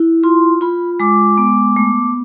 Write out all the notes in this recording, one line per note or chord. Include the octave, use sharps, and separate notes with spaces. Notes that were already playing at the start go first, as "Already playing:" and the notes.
Already playing: E4
F4 C6
F4 B5
G#3 D6
B3
A3